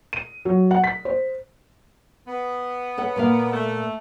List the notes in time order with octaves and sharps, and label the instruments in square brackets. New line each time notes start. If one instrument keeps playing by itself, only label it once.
[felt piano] D#7
F#3
F#5
B6
C5
[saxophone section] B3
[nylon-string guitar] A4 C#5 F#5
A#2 A#3 F5
[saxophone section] A3